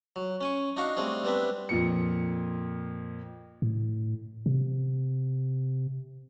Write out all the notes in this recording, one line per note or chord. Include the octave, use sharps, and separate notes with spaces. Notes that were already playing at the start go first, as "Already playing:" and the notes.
F#3
C#4 G#5 C#6
D4 D#4 F#4 F5 C#6
G3 A3 C4 D4 G#4
G3 B3 C4 D4 E5
F2 A#2 C#7
A2
C3